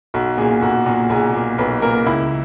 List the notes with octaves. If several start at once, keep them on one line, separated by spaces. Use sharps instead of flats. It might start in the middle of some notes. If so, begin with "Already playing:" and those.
B1 F#4
A#2 A#3 G#4
B1 F#4
A#2 A#3
B1 G#4
A#2 A#3
B1 B4
A#2 A#3 A#4
C#2 E4